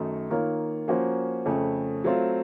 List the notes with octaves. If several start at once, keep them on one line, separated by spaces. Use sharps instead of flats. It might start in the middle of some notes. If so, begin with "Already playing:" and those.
Already playing: F#2 D#3 A3 D#4
D#3 A#3 F4 A#4 C#5
F3 A#3 C#4 F#4 C5
F2 C#3 A3 C#4
F#3 A3 C4 F4